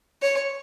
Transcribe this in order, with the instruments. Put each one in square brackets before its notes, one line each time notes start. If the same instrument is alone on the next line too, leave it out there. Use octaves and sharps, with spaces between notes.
[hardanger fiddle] C#5